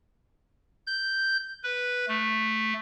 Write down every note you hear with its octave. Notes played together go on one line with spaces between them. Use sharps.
G6
B4
A3